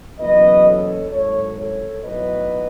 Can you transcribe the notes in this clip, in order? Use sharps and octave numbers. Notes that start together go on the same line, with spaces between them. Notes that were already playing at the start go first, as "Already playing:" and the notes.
F#1 E2 B2 F#3 B4 D#5
A4 C#5
G#1 G#2 F#3 A4 C#5
A4 C#5
B1 A2 F#3 B4 D#5